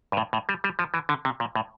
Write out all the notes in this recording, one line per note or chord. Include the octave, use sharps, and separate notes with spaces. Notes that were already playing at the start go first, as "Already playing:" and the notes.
G2
A2
A2
G3
G3
F3
E3
D3
C3
A#2
A2